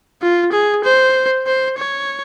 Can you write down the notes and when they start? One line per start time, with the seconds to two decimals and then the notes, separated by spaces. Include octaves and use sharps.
0.22 F4
0.52 G#4
0.84 C5
1.46 C5
1.78 C#5